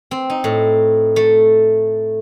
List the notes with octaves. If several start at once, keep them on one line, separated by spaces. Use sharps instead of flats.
C4
D#4
A2
A3